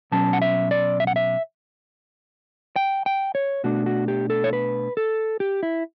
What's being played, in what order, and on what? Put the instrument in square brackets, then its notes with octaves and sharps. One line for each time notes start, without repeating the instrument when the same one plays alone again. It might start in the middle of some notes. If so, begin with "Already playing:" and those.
[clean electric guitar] B2 F#3 C#4 A5
F#5
E5
D5
E5
F#5
E5
G5
G5
C#5
B2 A3 D4 F#4
F#4
G4
A4
C#5
B4
A4
G4
E4